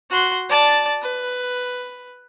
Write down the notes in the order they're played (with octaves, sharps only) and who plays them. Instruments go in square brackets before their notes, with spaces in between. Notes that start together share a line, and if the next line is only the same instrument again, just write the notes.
[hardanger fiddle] F#4 C6
D5 A5
B4